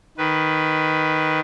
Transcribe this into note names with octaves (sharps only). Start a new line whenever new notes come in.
D#3 B4